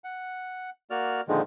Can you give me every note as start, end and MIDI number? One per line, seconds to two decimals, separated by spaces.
0.04 0.70 78
0.90 1.21 58
0.90 1.21 66
0.90 1.21 74
0.90 1.21 89
1.28 1.42 46
1.28 1.42 50
1.28 1.42 51
1.28 1.42 53
1.28 1.42 56